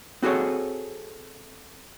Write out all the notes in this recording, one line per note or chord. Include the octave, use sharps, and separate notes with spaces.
C4 F#4 G#4 A4 C#5